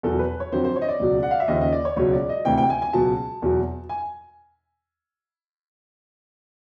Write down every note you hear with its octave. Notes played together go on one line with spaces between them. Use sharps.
E2 B2 F#3 A4
B4
C#5
F2 D3 F#3 C5
C5
C#5
D#5
D5
C#2 B2 F#3
F#5
F5
E5
D#2 C#3 F3 D#5
D#5
D5
C#5
C#2 B2 F#3 C#5
D5
D#5
D2 C3 E3 G5
G5
G#5
G#5
C#2 B2 F#3 A5
E2 B2 F#3
G#5